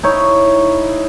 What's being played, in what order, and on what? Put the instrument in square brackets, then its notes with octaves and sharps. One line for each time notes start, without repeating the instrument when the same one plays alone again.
[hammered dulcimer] D#4 E4 C#5